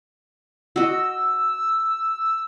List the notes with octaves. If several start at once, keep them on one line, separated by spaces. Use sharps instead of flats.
F#4 D#5 E6